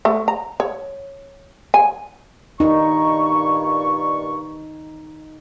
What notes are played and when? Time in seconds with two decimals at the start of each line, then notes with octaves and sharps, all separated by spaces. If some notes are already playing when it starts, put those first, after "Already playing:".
0.05 A3
0.28 A#5
0.60 C#5
1.74 G#5
2.60 G2 A#2 D#4 C#6